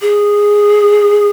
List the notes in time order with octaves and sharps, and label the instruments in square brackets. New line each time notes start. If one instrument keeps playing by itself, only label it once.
[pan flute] G#4